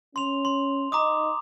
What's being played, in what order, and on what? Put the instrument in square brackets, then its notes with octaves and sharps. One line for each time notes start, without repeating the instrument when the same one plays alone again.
[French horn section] C#4 [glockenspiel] C6 F7
[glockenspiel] C6
[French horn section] D#4 D#5 [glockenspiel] A#5 D6 D#6